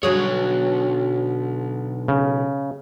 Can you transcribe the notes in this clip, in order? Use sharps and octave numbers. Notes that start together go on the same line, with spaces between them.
B1 D3 F#3 G#4 C#5
C#3